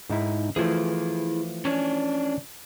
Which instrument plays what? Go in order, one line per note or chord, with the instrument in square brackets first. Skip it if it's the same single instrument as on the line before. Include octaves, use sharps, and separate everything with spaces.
[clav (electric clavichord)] G#2 D#4 E4
[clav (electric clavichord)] E3 F3 A3 [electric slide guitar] E4 G#4
[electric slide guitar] C#4 D4 C#5